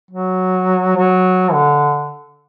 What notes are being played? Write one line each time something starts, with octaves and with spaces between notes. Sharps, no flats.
F#3
F#3
D3